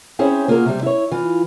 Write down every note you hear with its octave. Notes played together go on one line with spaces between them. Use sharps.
C4 C#4 E4 G#4 C5 C#5
A#3 F4 F#4 G#4 A#4
C3 G3
E4 C#5
E3 F4